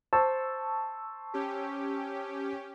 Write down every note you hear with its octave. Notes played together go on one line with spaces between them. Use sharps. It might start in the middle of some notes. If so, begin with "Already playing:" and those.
C5 A5 C#6 E6
C#4 G4